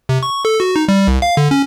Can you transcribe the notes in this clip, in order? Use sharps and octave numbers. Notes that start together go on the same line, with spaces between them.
C3
C#6
A4
F#4
D#4
G3
C2
F5
D3
C#4